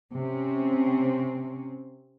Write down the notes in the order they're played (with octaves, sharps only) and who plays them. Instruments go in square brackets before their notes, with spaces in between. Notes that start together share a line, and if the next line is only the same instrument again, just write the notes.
[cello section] C3 C4 C#4